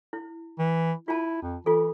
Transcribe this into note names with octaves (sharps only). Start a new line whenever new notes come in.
E4
E3
E4 F4 A5
F2
E3 F4 A4